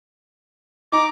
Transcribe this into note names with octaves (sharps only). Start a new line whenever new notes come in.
D#4 A#5 D6